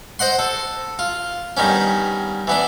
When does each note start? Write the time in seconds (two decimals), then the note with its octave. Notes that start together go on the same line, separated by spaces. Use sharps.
0.19 C5 D#5 F#5 C6
0.39 A4
0.99 F4
1.57 G2 D#3 B3 C#4
2.47 E3 B3 D4